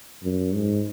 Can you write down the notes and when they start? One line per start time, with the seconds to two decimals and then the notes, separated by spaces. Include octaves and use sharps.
0.23 F#2
0.54 G#2